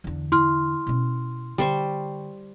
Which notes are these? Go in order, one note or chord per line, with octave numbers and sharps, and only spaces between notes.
E2 D3
E4 C6 F6
B2 C#4
D3 G3 C5 C#6